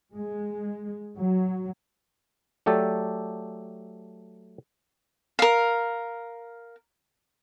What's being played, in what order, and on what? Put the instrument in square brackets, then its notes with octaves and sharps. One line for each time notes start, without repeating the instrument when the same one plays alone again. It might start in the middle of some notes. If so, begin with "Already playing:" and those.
[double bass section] G#3
F#3
[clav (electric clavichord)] F#3 A3 G4 A4 D5
[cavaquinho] A#4 F5